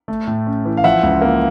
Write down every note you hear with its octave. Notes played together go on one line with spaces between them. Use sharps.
A3
A2
C#4
E3
F5
F3 E5 F#5
C#2
A#3